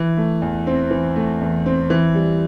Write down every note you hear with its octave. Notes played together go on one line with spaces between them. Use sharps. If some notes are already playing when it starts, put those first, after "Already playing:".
Already playing: E3
A3
E2
C4
E3
A3
E2
C4
E3
G3